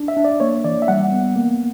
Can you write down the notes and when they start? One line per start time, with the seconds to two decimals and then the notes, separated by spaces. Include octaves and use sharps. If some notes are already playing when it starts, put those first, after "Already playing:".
Already playing: D4
0.08 E5
0.17 D4
0.24 D5
0.40 A#3 C#5
0.64 E3 D5
0.82 E5
0.88 G3 F#5
1.12 B3
1.36 A#3